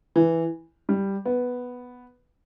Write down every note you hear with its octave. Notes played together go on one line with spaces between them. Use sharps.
E3
G3
B3